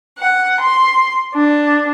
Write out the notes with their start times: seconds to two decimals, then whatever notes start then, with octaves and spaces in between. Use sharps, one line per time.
0.18 F#5
0.61 C6
1.35 D4